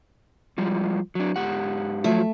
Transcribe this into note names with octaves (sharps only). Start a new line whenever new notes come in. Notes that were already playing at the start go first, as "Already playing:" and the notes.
F3 G3 G#3
F#3 D4
G#2 G4 F#5
F3 F#3 A3